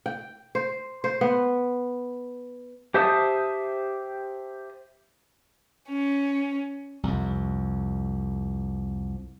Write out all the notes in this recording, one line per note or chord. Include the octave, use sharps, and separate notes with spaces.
G5
C5
C5
B3
G4 C5 E5 A5 D#6
C#4
C2 F2